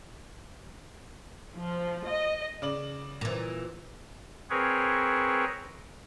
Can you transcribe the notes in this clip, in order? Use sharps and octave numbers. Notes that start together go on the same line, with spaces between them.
F3
D#5
C#3 D5 F#7
A#2 E3
C4 G#4 A#4 B4 C#5